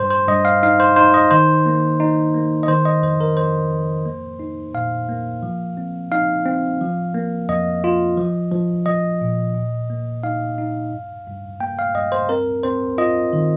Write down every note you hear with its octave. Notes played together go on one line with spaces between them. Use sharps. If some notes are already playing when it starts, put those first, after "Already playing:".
Already playing: G2 C5
C5
G2 D#5
F5
D#4 F5
C5
D#4 C5
D#5
D#3 C5
A#3
D#4
A#3
D#5
D#3 C5
D#5
F2 C5
A#4
F2 C5
F2
A#3
D#4
A#2 F5
A#3
F3
C4
D#4 F5
C4
F3
A#3
F2 D#5
F4
F3
F3
F3 D#5
A#2
A#2
A#3
D#4 F5
D#4
G2
G2
A#3 G5
F5
G2 D#5
C5
C4 A#4
C4 C5
F4 D#5
D#3